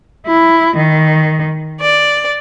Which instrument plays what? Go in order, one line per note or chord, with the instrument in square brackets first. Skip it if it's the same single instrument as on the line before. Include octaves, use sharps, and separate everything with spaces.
[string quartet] E4
D#3
D5